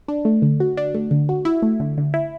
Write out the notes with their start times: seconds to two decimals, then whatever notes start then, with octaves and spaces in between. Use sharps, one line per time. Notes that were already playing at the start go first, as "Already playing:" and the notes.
0.08 D4
0.25 A3
0.42 D3
0.60 F#4
0.77 D4
0.95 A3
1.11 D3
1.29 F#4
1.45 E4
1.62 A3
1.80 D3
1.98 D3
2.14 E4